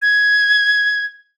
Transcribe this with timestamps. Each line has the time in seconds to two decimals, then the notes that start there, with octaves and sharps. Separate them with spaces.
0.02 G#6